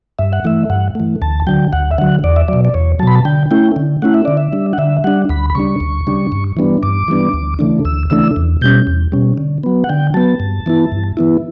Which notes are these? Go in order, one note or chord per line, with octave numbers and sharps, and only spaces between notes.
G2 E5
F#5
E3 A3 E5
G2 F#5
E3 A3
D2 A5
D3 F#3 G5
D2 F#5
E5
D3 F#3 F#5
E2 D5
E5
B2 F#3 D5
D5
E2 C#5
B2 F#3 A5 B5
A5
D3 G5
A3 C#4 E4 G5
D3
A3 C#4 E4 F#5
E5
D3 D5
E5
G3 D4
F#5
D3 E5
G3 D4 F#5
D2 B5
B5
C#3 G3 D4 C#6
D2
C#3 G3 D4
G2
E3 G3 B3 D4
G2 D6
E3 G3 B3 D4
D2
C#3 E3 A3 D4
D2 E6
C#3 E3 A3 D4 E6
E2
B2 G3 C#4 G6
E2
B2 G3 C#4
D3
F#3 B3
F#5
D3 G5
F#3 B3 A5
G2
E3 B3 E4
G2
E3 B3 E4